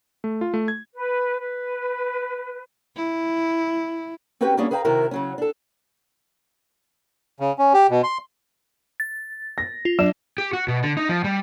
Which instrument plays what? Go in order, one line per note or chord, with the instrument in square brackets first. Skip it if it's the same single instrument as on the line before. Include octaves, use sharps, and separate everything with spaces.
[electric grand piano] A3
F4
A3
G#6
[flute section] B4
B4
[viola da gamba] E4
[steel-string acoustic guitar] C4 C#4 F#4 G4 B4 G5
G3 A#3 B3 C#4 D4 G#4
G#4 B4 F5 G5 G#5 A#5
C3 D#3 E4 F#4 A#4
C#3 F#3 C#4
D4 A4
[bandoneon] C#3
C#4
G4
B2
C6
[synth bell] A6
[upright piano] A#6
[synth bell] F4
[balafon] F#3 [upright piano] D4 [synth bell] E7
[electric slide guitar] G4
F#4
B2
D3
D#4
F3
G3